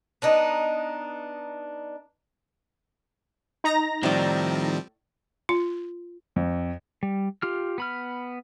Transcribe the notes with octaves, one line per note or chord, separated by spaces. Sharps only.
B3 D4 D#4
D#4 A#5 A#6
A2 D#3 F3 G3 C4 D5
F4
F2
G3
F4 G4 F6
B3 B5 F6